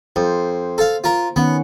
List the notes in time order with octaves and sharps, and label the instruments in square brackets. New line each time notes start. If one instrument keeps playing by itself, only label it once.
[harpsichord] F2 [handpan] C5
[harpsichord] A4 F5
F4 A#4
[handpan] D#3 C#4 F#5 [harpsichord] B3